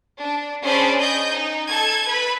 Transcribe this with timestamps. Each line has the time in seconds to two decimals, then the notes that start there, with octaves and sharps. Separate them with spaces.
0.19 D4
0.65 C#4 D4 G#4 C5 D5 B5
0.99 D#5 G#5 G6
1.32 D#4
1.67 A4 A5 G#6
2.07 B4 B5